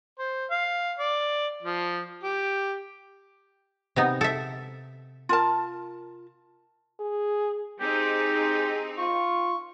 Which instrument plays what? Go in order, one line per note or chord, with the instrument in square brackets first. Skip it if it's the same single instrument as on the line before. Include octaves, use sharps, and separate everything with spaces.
[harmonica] C5
F5
D5
F3
G4
[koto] C3 B3 D#4
A4 E5
[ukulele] F4 A#4 A5
[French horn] G#4
[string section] C4 D#4 [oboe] G4 [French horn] G#4
[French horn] F4 [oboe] C#6